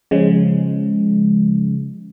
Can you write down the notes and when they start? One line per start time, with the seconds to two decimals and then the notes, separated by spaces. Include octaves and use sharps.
0.11 C#3 F3 G#3